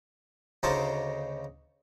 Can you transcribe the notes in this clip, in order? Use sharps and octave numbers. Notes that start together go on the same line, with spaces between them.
D2 C#3 D#4 C5 F5 A5